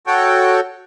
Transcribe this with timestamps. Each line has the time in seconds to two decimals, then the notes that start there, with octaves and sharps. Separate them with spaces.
0.07 F#4 A4 C#5 G5